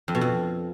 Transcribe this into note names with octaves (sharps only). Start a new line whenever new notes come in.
F2
B2
F2